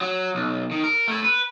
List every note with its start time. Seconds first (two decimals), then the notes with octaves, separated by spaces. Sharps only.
0.01 F#3
0.35 B1
0.71 D#3
0.84 A#4
1.08 A3 E4
1.24 B4